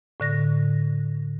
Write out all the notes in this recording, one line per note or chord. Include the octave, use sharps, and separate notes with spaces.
A2 D3 A#6